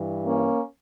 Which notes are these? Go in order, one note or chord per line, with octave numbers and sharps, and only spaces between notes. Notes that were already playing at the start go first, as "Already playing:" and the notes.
Already playing: G2 E3
A#3 C#4